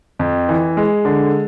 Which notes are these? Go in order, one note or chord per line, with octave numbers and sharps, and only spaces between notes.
F2
E3
G#3
D3